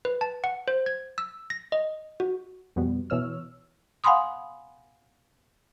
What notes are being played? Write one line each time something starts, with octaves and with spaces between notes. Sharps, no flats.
B4
A5
F#5
C5
G#6
E6
A#6
D#5
F#4
F2 B2 G3 B3
B2 E3 C#5 E6 F6
F5 F#5 G#5 B5 C6 D#6